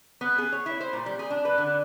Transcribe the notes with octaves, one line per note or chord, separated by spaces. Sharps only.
B3
G#4
C#5
E4
C5
A#2
G3
G#4
D4
B4
D3